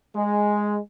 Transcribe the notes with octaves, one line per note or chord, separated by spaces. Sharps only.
G#3